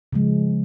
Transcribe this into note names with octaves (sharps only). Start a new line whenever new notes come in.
C#3 F3 G#3